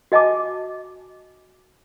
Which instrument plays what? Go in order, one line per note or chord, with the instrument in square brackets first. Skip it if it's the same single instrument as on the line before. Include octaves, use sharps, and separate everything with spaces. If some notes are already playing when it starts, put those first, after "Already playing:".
[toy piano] F#4 D#5 G#5 A5 D6